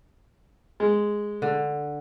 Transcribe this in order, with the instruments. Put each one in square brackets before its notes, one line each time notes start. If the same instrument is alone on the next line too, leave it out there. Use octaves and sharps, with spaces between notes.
[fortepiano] G#3
[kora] D3